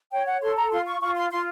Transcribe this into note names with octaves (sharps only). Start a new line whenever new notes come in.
C#5 G5
F#5
A4 C6
A#5
F4 C6
C#6
F4 C#6
C6
F4 C6